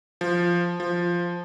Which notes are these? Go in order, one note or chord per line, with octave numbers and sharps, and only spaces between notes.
F3
F3